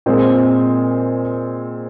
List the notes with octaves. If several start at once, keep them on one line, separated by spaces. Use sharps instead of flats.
A#2 G#3 C4